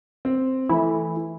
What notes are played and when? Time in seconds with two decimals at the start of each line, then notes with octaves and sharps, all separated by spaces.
0.25 C4
0.69 E3 A3 E4